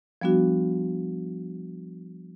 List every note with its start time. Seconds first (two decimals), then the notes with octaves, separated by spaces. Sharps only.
0.21 F3 G3 B3 D4 F#4